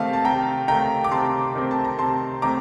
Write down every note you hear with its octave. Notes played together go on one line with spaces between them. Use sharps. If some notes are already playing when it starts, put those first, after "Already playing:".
Already playing: C3 D#3 A3 C4 F5 A5
A5
C3 G5 A#5
D#3 A3 C4 G5 A#5
D6
C3 A5 C6
D#3 A3 C4
A5
A#5
C3 A5 C6
D#3 A3 C4 A#5 D6